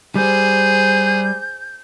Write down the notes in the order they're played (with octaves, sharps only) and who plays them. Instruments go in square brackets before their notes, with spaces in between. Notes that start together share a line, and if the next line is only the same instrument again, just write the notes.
[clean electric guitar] G3 [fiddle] G#4 C5 [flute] G6